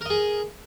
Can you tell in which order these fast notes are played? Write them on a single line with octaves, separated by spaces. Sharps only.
A#4 D#5 G#4